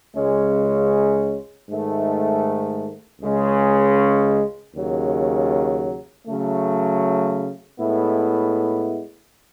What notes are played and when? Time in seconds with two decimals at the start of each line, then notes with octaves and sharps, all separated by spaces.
0.15 C#2 C#3 G#3 C#4
1.68 G#2 D#3 A3
3.21 C#2 C#3 G#3 C#4
4.73 D#2 C#3 F#3
6.26 C#3 F#3 A3
7.79 A2 G#3 B3 E4